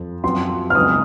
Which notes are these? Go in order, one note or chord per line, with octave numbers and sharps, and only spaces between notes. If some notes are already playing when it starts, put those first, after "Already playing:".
Already playing: F2
F#2 F3 C4 F#4 C6
F6
C#2 C#3 G#3 C4 D#4 D#6